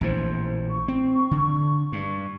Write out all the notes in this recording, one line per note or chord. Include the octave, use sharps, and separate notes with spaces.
A#1 A2 E3 C5
C#6
C4
D3
G2